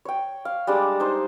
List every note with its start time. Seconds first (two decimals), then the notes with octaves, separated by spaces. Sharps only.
0.05 C#5 G5
0.45 F5
0.67 G3 G#3 D4
1.00 D#4 C5